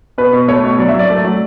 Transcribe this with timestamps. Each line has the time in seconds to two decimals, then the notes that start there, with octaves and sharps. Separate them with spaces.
0.18 B2 B4
0.33 B2
0.48 A3 C#5
0.64 B2
0.78 F#3 D5
0.89 E5
0.94 F#3
0.99 D5
1.10 A3
1.25 F#3